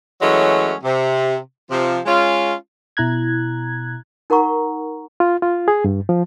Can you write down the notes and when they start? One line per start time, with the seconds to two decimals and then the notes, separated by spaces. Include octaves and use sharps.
0.21 E3 F#3 G#3 A3 C#4
0.84 C3
1.70 C3 F3
2.06 G#3 C#4 F4
2.97 B2 E4 A#5 F#6 G#6
4.30 D#4 A#4 F#5 A#5 C#6
5.20 F4
5.42 F4
5.68 G#4
5.84 G2
6.09 F3